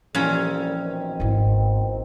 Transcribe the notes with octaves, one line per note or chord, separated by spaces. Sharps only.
C2 F2 A#2 E3 F3 G3 C#4
B2 D#3 C4
G#1 E4